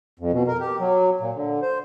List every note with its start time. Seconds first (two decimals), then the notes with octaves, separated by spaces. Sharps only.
0.19 F2
0.33 B2
0.47 A#4
0.60 G4
0.80 F#3
1.21 A#2
1.35 D3
1.62 C5